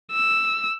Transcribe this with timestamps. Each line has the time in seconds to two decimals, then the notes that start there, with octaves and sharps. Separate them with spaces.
0.11 E6